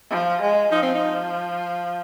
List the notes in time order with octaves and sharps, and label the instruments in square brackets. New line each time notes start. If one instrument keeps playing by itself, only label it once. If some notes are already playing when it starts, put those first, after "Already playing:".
[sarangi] F3
G#3
[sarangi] F3 [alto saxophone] D#4
[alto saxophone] C4
D#4